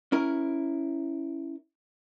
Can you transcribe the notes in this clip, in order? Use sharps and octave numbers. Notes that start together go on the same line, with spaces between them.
C#4 E4 A#4